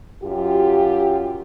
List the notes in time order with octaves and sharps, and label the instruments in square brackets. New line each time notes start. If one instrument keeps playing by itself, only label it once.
[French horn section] F#2 F4 G4